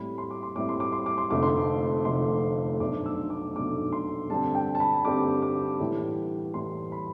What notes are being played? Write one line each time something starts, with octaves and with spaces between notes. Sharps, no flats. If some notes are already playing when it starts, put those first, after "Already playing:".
Already playing: A2 G3 C4 E4 B5
C6
D6
C6
A2 G3 C4 E4 D6
C6
D6
C6
D6
C6
F1 F2 D3 A3 D6
C6
F1 F2 D3 A3 C6
B1 B2 A3 D4 D6
E6
D6
B1 B2 A3 D4 D6
C6
G2 D3 G3 C4 A5
G5
A5
B5
G2 D3 G3 C4 D6
D6
A2 E3 G3
A2 E3 G3 C6
B5